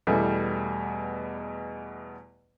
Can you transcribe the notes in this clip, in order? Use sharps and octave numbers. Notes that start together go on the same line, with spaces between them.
E2 B2 E3 G3 A3